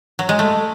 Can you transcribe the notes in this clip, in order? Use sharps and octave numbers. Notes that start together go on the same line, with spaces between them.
F#3
G#3
A3